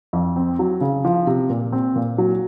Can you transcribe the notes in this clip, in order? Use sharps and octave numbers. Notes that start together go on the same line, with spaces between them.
F2
C4
F#3
C#3
F3
C3
A#2
C4
A#2
F#3